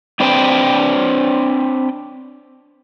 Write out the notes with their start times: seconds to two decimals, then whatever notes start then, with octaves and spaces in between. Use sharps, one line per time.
0.20 C4 D4 B4 C5 F5 G5